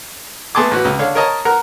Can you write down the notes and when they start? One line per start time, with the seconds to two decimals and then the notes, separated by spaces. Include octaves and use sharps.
0.55 A3 B3 G#4 A5 C6 D6
0.71 A1 F#4 B4
0.85 C#2
0.99 D3 C#5 F5
1.15 A#4 C#5 D#5 A5 A#5
1.45 A#4 F#5 A#5